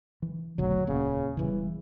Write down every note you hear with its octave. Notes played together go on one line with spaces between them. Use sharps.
E3
F1 B1 D3 F#3 A3
D1 E2 A#2 C#3
E1 E2 C#3 E3 G3